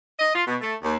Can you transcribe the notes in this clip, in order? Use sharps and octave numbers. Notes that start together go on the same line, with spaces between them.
D#5
F4
B2
A3
D#2